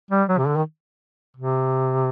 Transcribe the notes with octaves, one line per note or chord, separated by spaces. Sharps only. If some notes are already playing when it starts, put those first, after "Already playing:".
G3
F#3
C3
D3
D#3
C3